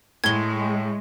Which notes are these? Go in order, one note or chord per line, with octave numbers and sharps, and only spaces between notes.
A2 G#3 G#6 G7